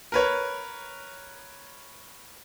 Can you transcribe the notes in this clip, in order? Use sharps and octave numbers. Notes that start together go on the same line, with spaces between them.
A#4 B4 C#5